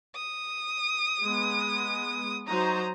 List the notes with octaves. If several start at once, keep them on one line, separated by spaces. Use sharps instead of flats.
D#6
G#3 B3
F#3 D#4 C5 A#5 D#6